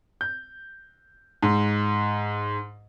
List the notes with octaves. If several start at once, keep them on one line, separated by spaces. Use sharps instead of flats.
G6
G#2